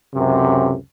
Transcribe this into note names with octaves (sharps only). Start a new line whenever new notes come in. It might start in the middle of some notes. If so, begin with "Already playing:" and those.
C#2 F#2 C3